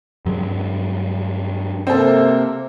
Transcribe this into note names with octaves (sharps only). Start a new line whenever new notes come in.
G2 F#3 G#3
C3 A#3 C4 A4